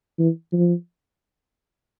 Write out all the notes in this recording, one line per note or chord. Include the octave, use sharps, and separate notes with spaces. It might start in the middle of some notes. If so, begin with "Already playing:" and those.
E3
F3